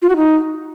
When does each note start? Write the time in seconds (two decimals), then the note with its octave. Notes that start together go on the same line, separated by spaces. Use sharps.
0.02 F4
0.09 F#4
0.16 D#4